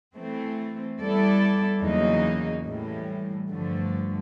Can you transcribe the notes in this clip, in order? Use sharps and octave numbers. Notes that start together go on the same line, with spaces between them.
E3 A3 C4
G3 B3 E4 A4 D5
E2 C#3 F#3 A#3 D#4
A2 E3 G3
G2 D3 F3 A3